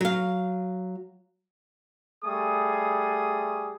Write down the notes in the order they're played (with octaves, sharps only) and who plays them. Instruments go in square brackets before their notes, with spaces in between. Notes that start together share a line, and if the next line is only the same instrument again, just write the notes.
[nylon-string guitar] F#3 F5
[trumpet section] G3 A3 G#4 D#6